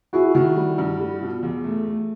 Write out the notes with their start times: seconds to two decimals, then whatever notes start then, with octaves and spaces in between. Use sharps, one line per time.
0.13 E4 F#4 G#4
0.34 D#3 E4 F#4
0.56 G3
0.78 G2
1.00 G3
1.21 B2 F4
1.43 E2
1.64 A3
1.85 A3